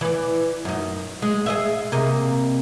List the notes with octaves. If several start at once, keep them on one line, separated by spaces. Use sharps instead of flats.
E3 D5
F#2 D#4
G#3
G#4 D#5 E5
C3 A#3 D#5